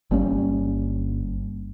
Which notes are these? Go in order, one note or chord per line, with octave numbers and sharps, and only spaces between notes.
G1 G3 A#3 C#4